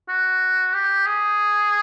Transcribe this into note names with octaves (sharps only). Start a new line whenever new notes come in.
F#4
G4
G#4